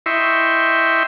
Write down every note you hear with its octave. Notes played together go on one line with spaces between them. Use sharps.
E4 D#5 E5 G5 C6 C#6